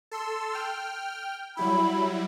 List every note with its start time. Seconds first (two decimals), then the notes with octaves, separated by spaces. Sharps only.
0.11 A4 C6 E6
0.53 G5 F6
1.57 F#3 G3 E4 B5